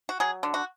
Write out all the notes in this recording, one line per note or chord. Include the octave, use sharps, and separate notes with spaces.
F#4
F#3 G#4
D3
F#4